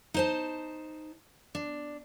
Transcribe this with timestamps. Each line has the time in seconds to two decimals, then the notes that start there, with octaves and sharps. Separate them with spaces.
0.14 D#4 C5 A5
1.55 D4